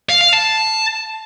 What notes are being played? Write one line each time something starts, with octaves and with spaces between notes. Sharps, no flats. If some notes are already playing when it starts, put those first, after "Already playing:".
F5
F5
A5